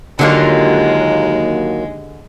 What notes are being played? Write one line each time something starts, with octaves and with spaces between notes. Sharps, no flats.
D#2 D3 F#3 G#3 A#3 F4 G4